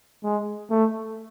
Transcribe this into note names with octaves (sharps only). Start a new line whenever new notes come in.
G#3
A3